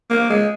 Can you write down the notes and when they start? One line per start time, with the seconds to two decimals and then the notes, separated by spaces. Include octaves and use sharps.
0.10 A#3
0.30 G#3